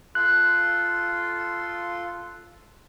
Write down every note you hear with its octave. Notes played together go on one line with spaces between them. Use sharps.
F4 A4 C6 F#6